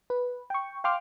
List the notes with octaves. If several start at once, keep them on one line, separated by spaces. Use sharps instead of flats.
B4
G5 C#6
F5 G5 C6 D6 F6